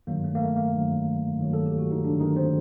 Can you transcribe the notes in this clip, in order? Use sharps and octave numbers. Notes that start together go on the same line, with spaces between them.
G2 D#3 F#3 A#3
A3
A#3
A3
A#3
G2 D#3 F#3
G2 D#3 F#3
A4
G4
F#4
D#4
G2 D3 D#3 F#3 D4
D#3 D#4
C4 C5